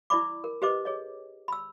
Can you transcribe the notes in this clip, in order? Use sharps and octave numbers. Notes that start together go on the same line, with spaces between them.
E4 C5 D5 B5 D6
A#4
G4 B4 C5 D#5 D6
G#4 C#5 D#5
B5 E6